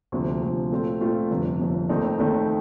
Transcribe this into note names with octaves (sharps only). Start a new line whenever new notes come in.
D2 C3 F3
D2 C3 F3
A#2 A3 C4 F4
A#2 A3 C4 F4
G1 F2 C3
G1 F2 C3
D#2 D#3 A3 C4 D#4
D#2 D#3 A3 C4 D#4